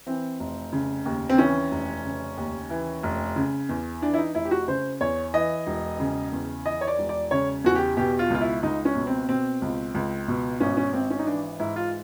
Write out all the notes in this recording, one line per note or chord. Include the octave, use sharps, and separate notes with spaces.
E3 C4
F1
C#3
D#2
C4
E3 C#4
F1
C#3
D#2
E3
F1
C#3
E2
E3 D4
E4
D#4
F1 E4
G4
F#4
C#3 C5
E2 C#5
E3 D#5
E1
C#3
E2
E3 D#5
C#5
D5
E1
D5
C#3 C#5
E2 F#4
G4
B2 G4
F4
C#2 F4
E4
C#2 D#4
C#4
B2
C4
B2 C4
C#2
C#2
B2
G#1 C#4
C#4
G#1 C4
C#4
D#4
E3 D4
G#2 E4
F4